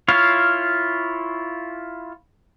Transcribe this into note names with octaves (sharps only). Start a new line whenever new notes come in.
E4 F4 C#5 F5